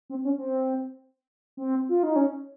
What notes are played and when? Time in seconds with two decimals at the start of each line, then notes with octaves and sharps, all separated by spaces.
0.09 C4
0.24 C#4
0.38 C4
1.57 C4
1.89 F4
2.03 D#4
2.16 C#4